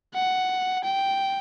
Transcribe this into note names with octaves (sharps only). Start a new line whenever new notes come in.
F#5
G5